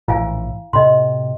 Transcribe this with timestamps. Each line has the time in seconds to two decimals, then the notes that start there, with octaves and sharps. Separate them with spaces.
0.08 A#1 A2 E3 E4 F5 G#5
0.73 A2 C3 D#5 C6